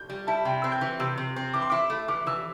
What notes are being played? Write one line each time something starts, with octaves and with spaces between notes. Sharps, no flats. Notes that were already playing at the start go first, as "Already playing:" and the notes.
Already playing: G6
G3
E4 A5
C3 G5
C4 E6
G6
E3
C3 E6
C3
C4
E3 D6
C6
E4 D6
A3
E3 D6
E3 E6